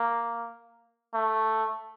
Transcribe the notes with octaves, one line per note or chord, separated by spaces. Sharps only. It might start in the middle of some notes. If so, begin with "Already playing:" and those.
Already playing: A#3
A3